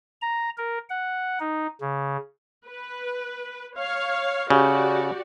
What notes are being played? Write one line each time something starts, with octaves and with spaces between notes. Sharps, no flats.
A#5
A#4
F#5
D#4
C#3
B4
C#5 F5
C#3 F#4 G4 D5